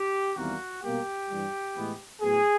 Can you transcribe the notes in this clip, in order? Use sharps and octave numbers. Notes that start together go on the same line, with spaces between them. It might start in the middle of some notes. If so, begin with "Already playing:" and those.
Already playing: G4
E2 C3 D#3 G3 A#3 F#4
B2 G3 A#3 G4
G2 E3 G3
A2 E3 G#3 B3
A2 F#3 B3 G#4